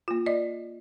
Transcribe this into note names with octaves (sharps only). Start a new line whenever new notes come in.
A#3 F4
D5 D#5